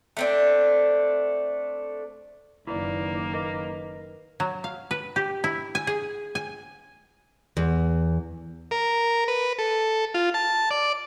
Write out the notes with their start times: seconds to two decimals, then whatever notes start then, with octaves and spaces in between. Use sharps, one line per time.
0.17 A3 C4 D4
2.67 F#1 D#3 A#3 E4 B4 D5
3.34 A#4 B4 D#5
4.40 F#3
4.64 F5
4.91 B4
5.16 G4
5.44 E4
5.75 G#5
5.87 G#4
6.35 G#5
7.57 E2
8.71 A#4
9.28 B4
9.59 A4
10.14 F4
10.34 A5
10.71 D5